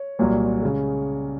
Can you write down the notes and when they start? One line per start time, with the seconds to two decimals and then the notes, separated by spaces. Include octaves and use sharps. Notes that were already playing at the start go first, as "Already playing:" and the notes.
Already playing: C#5
0.19 C2 A#2 F#3
0.62 C#3 G#3